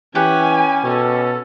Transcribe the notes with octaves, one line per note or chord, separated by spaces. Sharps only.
E3 C#4 G4 B4 F#5 G#5
B2 C#4 A4